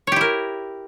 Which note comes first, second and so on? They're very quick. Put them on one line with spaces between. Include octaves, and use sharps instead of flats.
C#5 G4 E4 A#4